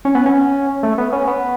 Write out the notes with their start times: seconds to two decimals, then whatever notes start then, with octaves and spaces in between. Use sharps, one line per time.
0.05 C#4
0.15 B3
0.26 C#4
0.83 A3
0.98 B3
1.13 C#4
1.27 B3